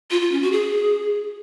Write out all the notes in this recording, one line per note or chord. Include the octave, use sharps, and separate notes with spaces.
F4
F4
C#4
F#4
G#4